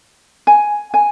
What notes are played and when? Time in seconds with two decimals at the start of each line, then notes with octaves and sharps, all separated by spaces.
0.47 G#5
0.94 G#5